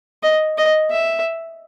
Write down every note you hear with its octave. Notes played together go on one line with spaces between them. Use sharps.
D#5
D#5
E5